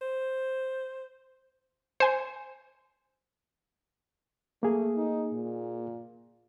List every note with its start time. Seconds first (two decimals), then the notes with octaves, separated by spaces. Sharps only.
0.01 C5
2.00 C5 G#5
4.63 A3 A#3 G#4
4.96 D#4
5.33 A#2